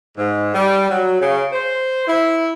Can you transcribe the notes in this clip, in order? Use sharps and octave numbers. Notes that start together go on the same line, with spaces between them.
G#2
G3
F#3
C#3
C5
E4